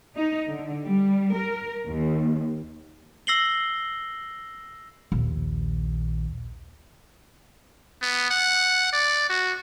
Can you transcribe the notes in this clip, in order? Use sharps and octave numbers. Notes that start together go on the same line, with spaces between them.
D#4
D3
G3
A#4
D#2
E6 A#6 C7 F#7 G7
A#1 D#2
B3
F#5
D5
F#4